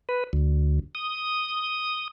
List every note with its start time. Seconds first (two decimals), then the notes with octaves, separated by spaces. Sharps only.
0.09 B4
0.33 D2
0.95 D#6